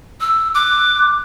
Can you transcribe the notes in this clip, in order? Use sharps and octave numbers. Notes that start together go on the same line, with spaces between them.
E6
D6 F#6